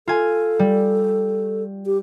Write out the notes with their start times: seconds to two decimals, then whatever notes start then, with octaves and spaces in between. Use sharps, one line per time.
0.08 F4 A4 G#5
0.59 G3
1.86 G4